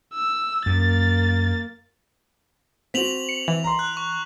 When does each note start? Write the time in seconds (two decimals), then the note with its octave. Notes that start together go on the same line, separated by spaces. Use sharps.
0.14 E6
0.66 F#2 A#3 A6
2.94 C4 F#4 B6 F7 F#7
3.29 C#7
3.48 E3 F7
3.64 A#5 C6
3.79 F#6
3.97 C#6